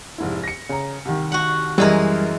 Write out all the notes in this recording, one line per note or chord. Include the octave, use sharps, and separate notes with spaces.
F1 G#2 E4
A#6 C#7
C#3 A#5
C2 D#3
F#4 F#5
F#2 E3 G3 G#3 G#4 A#4